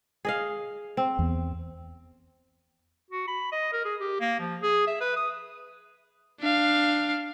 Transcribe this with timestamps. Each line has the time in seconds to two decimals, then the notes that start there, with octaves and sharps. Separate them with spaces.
0.25 G#4 D#5 F5
0.97 C4
1.19 E2 B3
3.10 F#4
3.28 B5
3.52 D#5
3.73 A#4
3.85 G#4
4.00 G4
4.21 A#3
4.40 F3
4.62 G#4
4.87 E5
5.01 B4
5.16 D#6
6.40 D4 F5